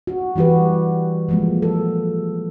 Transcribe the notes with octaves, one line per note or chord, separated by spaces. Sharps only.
F#4
E3 G3 F#4 G4 B4
F3 G#3 A#3
A4